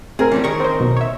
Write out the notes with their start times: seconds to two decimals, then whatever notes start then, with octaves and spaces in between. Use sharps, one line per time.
0.19 A2 C4 G#4 A#4
0.32 E3 F3 G3 C#4
0.44 D#3 A#4 C#6
0.60 C4 C5
0.79 B1 B2
0.97 C#5 E5